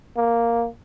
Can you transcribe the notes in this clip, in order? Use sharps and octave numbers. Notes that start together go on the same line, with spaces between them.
A#3